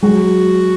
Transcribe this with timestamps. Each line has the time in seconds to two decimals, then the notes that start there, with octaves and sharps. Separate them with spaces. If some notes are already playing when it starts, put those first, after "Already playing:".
0.02 F#3 G#3 F#4